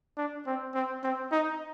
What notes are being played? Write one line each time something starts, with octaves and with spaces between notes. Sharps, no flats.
D4
C4
C4
C4
D#4